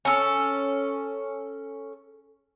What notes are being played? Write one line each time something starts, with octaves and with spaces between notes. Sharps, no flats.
C#4 A4